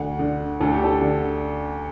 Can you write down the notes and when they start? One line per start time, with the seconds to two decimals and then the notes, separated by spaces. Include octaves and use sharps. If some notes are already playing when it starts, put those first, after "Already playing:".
Already playing: D2 F#5
0.19 D3
0.60 D2 A4
0.73 G4
0.84 A4
1.01 D3